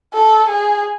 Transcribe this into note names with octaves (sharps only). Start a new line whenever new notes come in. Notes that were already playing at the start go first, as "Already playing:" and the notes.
A4
G#4